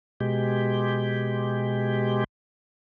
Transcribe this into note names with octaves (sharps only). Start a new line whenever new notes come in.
B2 G#3 G4